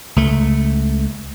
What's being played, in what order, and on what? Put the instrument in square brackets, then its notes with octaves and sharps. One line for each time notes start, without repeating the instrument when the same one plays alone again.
[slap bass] C#2 A3